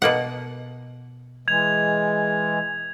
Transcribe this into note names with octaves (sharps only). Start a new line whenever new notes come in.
B2 A#3 F#5
E3 G#3 G#6 F7